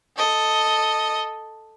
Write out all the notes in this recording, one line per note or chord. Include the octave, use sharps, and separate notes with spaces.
A4 D#5